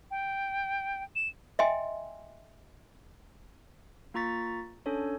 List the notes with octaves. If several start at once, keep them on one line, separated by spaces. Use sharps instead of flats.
G5
E7
D#5 E5 G5 G#5 C6
A#3 F4 A#5 C#6 A6 B6
C#4 D4 A4 C#5